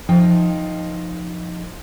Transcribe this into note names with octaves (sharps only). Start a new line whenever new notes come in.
F3 D#4 G5